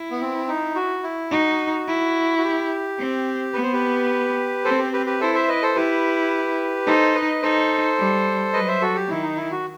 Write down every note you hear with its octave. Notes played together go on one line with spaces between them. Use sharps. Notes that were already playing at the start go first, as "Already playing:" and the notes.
Already playing: E4
B3
C4
D#4
F#4
E4
D#4 F#4
E4
F#4
G4
C4
B3 B4
C5
G4 B4
C4 A4 C5
G4
G4 B4
G4 B4
E4 A4 C5
C5 E5
B4 D#5
A4 C5
E4 G4 B4
D#4 A4 C5
B4 D#5
D#4 A4 C5
G3
F#3 B4 D#5
C5 E5
F#4 A4
G4
D#3 E4
D#4
E4
F#4